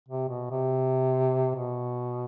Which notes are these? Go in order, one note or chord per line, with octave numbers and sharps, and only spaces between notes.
C3
B2
C3
B2